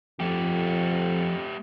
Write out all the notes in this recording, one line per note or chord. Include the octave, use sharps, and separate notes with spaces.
F2 F3 A3 G4